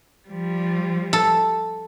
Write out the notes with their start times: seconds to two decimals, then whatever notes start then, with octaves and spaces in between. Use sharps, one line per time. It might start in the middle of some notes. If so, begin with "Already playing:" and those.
0.29 F3 G3
1.13 A4